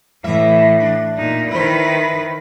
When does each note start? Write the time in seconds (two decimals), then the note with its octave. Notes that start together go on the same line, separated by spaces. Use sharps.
0.24 A2 E3 E5
0.80 D4
1.18 A#2 D#4
1.51 D#3 E4 B4 C5